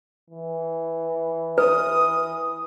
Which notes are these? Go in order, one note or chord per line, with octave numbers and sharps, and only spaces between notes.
E3
B4 D#6